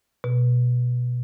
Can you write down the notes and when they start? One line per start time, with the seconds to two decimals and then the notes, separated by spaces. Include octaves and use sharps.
0.24 B2